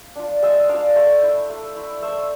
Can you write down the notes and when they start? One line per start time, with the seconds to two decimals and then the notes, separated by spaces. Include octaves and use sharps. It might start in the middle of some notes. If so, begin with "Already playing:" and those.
Already playing: F5
0.16 D4 F4
0.42 G#3 C5 E5
0.69 D4 F4 D5 F5
0.95 A3 C5 E5
1.23 E4
1.50 A3
1.76 E4
2.02 A3 C5 E5